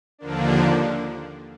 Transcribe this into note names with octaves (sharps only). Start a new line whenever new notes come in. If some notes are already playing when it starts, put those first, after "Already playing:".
D#2 D3 F3 A#3 D4